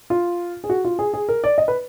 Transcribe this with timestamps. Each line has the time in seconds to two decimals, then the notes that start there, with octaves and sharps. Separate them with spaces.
0.10 F4
0.64 G#4
0.69 F#4
0.84 F4
0.99 G#4
1.14 G#4
1.29 A#4
1.44 D5
1.58 D#5
1.68 B4